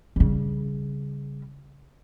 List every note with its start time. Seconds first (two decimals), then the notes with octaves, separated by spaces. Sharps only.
0.16 C#3 G3